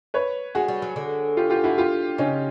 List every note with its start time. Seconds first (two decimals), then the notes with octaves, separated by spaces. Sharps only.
0.14 B4 C#5
0.55 G#3 F#4 G#4
0.68 G3
0.82 F#3
0.96 D3
1.37 F4 G4
1.50 F4 G4
1.64 E4 F#4
1.78 F4 G4
2.18 C#3 C#4 D#4